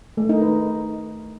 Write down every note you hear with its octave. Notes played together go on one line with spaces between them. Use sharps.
A3
D#4
B4